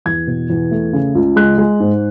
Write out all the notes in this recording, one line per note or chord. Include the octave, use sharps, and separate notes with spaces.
E2 G#6
B2
E2
A3
C#3
C#2
G#3 F#6
G#3
G#2